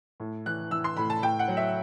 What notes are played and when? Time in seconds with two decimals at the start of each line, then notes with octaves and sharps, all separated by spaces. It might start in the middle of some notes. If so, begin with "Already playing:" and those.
0.20 A2
0.46 E3 F#6
0.71 E3 E6
0.84 C6
0.97 A2 B5
1.10 A5
1.23 A2 G5
1.39 F#5
1.48 F#3
1.57 E5